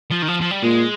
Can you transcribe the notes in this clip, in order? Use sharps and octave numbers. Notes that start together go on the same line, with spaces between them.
F3
D#3
F3
F3
G3
A#2 G#3